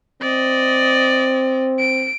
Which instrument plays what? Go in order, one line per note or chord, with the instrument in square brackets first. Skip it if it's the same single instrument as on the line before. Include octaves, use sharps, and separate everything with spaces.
[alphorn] C4 [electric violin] D5 D#5
[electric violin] D7